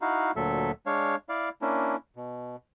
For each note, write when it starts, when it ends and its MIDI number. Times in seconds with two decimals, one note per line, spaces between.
0.02 0.31 63
0.02 0.31 64
0.02 0.31 66
0.02 0.31 77
0.36 0.71 38
0.36 0.71 46
0.36 0.71 54
0.36 0.71 69
0.36 0.71 76
0.86 1.16 56
0.86 1.16 62
0.86 1.16 73
0.86 1.16 77
1.29 1.49 64
1.29 1.49 74
1.29 1.49 77
1.62 1.96 58
1.62 1.96 61
1.62 1.96 62
1.62 1.96 64
2.16 2.56 47